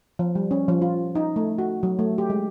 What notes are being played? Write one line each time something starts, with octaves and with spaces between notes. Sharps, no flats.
F3
G3
C#4
F3
F4
D#4
A3
F#4
F#3
A3
G4
G#3